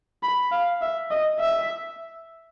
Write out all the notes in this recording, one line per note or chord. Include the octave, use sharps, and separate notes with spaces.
B5
F5
E5
D#5
E5